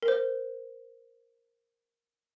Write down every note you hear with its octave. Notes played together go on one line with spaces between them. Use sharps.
A#4
C5